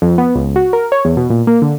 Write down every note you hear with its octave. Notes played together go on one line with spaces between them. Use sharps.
F2
B3
C#2
F#4
A#4
C#5
E2
B2
A#2
A#3
D3